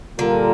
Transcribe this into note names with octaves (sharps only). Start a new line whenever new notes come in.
A#2 D3 G3 A#3 F4 A#4